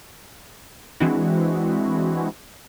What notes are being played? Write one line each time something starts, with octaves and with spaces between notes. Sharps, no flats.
E3 G#3 C4 D4 E4 F#4